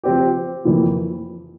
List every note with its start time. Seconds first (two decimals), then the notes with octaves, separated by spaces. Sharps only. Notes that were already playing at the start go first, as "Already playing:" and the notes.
0.04 F3 C4 G4
0.64 F2 E3 A#3